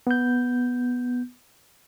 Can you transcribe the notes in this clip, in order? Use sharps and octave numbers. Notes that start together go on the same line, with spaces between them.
B3 G6